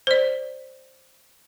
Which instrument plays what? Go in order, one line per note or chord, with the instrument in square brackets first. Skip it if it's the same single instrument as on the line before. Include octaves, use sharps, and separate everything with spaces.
[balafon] C5 D5